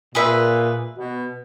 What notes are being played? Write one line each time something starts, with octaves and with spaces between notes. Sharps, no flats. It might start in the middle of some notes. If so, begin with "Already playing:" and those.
A#2 G#4 B4 E5
B2